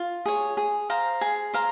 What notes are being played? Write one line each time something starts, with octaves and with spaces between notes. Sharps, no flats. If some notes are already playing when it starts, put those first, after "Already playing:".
Already playing: F4
G#4 C#5
G#4
C5 F5 A#5
G#4
C5 F5 A#5